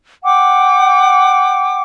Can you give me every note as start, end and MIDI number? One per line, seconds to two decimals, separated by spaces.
0.24 1.82 78
0.24 1.82 79
0.24 1.82 86